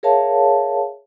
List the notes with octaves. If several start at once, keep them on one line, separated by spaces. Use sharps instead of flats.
G#4 A#4 C#5 E5 F5 A5